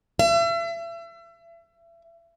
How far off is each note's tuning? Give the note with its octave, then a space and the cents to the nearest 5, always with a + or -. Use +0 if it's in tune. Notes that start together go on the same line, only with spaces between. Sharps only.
E5 +35